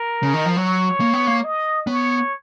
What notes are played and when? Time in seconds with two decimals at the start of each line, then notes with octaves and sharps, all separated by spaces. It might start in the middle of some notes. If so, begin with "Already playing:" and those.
Already playing: A#4
0.23 C#3
0.34 D#3
0.45 F3
0.57 F#3 C#5
1.00 A#3
1.13 B3
1.27 A#3
1.44 D#5
1.87 B3 C#5